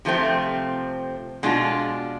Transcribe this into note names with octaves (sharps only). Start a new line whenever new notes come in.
C3 F3 A3 C4
B2 G#3 D4 F4